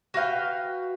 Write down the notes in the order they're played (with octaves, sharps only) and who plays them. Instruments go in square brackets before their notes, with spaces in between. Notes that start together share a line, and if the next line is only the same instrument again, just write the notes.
[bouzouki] F#4 B4 F5 G5